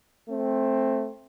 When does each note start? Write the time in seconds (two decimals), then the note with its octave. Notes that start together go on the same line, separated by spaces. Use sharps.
0.29 A3 C4